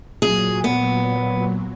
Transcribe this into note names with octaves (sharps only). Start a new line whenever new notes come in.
A#2 F#3 G#4
B3